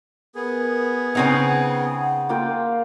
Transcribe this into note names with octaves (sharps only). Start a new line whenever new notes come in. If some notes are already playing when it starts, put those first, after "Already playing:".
B3 G#4 A#4
C#3 C4 D#4 F#5 G#5
A#3 F4 G5